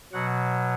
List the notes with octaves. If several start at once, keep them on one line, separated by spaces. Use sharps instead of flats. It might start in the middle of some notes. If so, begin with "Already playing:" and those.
B2 F#3 F#5